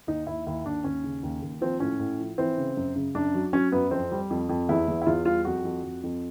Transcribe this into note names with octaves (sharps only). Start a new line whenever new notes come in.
D#2 D#4
D#2 E4
D#2 E4
D#2 D4
D#2 C#4
C#3
D#2
D#2
F3 C4
A2 C#4
A2
F3
E3 C4
C#3
F#2
C#3
F#2 D4
F#3
F#3 C#4
F#2 B3
F2 C4
G3
F2
F2
E2 E4
E2
E4
E2 F4
G3 F4
F2 F#4
F2
F2
F2